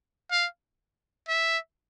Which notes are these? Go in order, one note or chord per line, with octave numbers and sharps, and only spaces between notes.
F5
E5